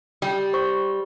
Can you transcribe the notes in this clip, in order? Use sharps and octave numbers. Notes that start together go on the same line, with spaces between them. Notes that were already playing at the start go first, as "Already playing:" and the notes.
G3
C5 C#6